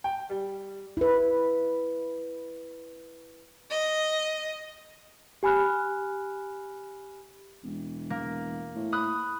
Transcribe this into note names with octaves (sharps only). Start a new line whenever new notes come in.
G5
G3
E4 B4
D#5
G4 G#5 B5 F6 F#6
E1
A#3
A2
B5 D#6 F#6